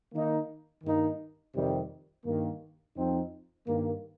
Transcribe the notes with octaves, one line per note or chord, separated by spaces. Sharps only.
D#3 A#3 D#4
G2 D#3 A#3 D#4
F2 C3 D#3 G3
G2 D#3 A#3
F2 F3 C4 D#4
G2 D#3 A#3